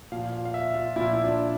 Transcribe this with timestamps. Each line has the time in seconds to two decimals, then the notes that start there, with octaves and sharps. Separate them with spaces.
0.12 A#2 F3 F5
0.32 F5
0.45 F5
0.54 E5
0.74 F4
0.96 A#2 F3 E4
1.13 E4
1.24 D4